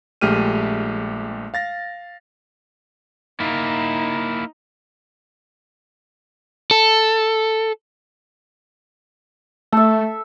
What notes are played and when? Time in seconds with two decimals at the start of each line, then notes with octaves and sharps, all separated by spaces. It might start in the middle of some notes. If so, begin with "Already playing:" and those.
0.21 A#1 G#3 A3 G4 F6 D#7
1.54 F5 A6 A#6
3.40 A#3 D#4 E4
6.71 A4
9.72 A3 A4 E5